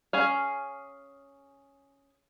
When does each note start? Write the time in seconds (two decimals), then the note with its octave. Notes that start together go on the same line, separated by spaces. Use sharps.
0.13 C#4 G#4 F5